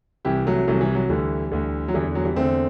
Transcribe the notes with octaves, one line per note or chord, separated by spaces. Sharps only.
C2 C3 E3 E4 G4
F#3 A3
C2 C3 E3 F#3 A3
E3 G3
F#3
D2 D3 E3 G3
D2 D3
F#3
E2 D3 E3 G3
F#3
E3 G3
E2 D3 A3 C4